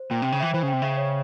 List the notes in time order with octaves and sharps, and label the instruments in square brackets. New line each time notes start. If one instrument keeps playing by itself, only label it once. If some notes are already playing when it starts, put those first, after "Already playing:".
Already playing: [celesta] C5
[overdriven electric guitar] A#2 [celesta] G5
[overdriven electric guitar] C3 [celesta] G5
[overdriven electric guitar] C#3
[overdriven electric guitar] E3 [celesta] E5
[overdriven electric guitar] E3 [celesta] C5
[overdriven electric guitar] C#3
[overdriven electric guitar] C3 [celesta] G5
[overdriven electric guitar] C#3 [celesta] E5
[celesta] C#5